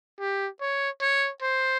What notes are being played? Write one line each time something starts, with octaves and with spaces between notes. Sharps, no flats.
G4
C#5
C#5
C5